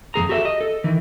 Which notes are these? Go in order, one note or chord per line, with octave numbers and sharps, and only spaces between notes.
F2 F3 G#4 A#5
F#4 G4 A4 C#5 E5
D#5
A4
D#3 E3